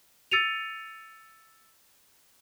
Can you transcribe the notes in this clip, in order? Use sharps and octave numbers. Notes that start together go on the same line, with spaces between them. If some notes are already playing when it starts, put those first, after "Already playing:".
E6 A6 C#7 D#7 F7